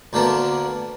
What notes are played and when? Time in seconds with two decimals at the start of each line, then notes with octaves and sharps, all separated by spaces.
0.13 D2 D3 A#3 B3 D4